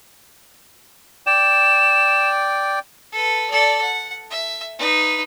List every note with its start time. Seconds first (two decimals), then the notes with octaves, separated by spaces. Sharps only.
1.27 D5 G5 E7
3.12 A4 B4
3.50 A4 D5
3.81 F#5
4.31 E5
4.79 D#4 B4